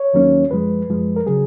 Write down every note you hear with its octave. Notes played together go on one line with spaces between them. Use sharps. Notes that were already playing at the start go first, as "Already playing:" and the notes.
Already playing: C#5
D#2 D#3 F#3 A#3 C#4
F#2 F3 G#3 B4
F#2 F3 G#3
A#4
C#3 F#3 G#4